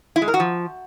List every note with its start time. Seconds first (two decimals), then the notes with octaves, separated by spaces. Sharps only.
0.16 E4
0.22 G#3
0.28 A#4
0.34 F#4
0.40 F3